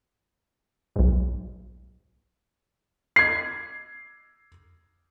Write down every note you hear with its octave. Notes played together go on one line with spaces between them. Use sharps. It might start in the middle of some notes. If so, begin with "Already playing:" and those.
B1 G#2
G#6 C7